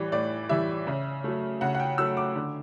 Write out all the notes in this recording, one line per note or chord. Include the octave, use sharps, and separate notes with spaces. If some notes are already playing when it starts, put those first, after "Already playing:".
Already playing: A2 E3 G3 D5
A2 D5
E3 G3 E5
C#3
F#3 A3
C#3 F#5
F#5
G5
F#3 A3 E6
D6
D3